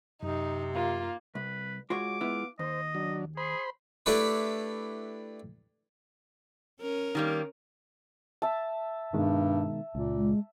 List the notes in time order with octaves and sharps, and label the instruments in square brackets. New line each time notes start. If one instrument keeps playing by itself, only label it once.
[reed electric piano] F#2 [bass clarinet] C3 [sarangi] D#4
[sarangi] A#3 [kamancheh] F4
[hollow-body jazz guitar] C2 [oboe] B4
[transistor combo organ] G#3 [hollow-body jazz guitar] F4 F#4 C#5 [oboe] D6
[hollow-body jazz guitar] B3 E4 F4
[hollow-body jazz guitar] D#2 [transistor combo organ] C5 [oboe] D#5
[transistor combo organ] F#3 D4
[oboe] G#4 [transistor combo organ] C5 B5 C6
[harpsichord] A3 D4 E4 G4 A4 B4
[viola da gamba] C#4 A#4
[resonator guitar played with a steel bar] D#3 G3 A#3
[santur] E5 A5
[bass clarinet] G2 [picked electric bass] B2 D#3 G#3
[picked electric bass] C#2 [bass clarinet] A#2
[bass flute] G#3